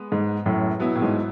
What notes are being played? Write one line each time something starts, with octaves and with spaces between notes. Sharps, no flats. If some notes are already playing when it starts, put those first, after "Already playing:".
Already playing: G#3 B3
G#2
F#2 A2
B2 F#3 B3 E4
A2
G#2